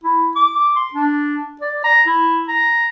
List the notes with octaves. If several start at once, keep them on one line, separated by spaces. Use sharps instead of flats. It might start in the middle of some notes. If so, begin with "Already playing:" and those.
E4
D6
C6
D4
D5
A#5
E4
A#5